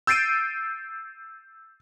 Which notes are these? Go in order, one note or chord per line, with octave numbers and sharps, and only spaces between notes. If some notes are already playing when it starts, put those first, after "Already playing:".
E6 G6 A6 C7 D7 D#7